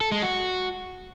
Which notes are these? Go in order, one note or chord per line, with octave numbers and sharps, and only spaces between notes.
A4
G#3
F#4